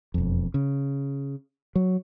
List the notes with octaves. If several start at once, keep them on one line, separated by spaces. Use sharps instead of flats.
E1 F2
C#3
F#3